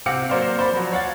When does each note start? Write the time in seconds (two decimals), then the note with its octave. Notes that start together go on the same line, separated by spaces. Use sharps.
0.06 C3 C4 F5 F#5 D6 C#7
0.29 F#3 A#3 C5 D5 F5
0.59 C5 D5 B5
0.72 F3 F#3
0.92 C#5 F5 F#5 A6